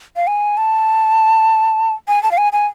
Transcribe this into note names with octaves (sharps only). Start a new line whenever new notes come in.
F5
G#5
A5
G#5
A5
F5
G#5
G#5